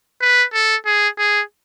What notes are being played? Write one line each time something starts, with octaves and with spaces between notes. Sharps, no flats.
B4
A4
G#4
G#4